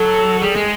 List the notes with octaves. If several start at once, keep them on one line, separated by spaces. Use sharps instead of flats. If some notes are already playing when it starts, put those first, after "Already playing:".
Already playing: F#3 A4
G3 G#4
G#3